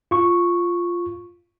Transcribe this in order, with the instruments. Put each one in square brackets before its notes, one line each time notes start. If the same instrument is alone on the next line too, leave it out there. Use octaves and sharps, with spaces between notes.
[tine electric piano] F4 C#6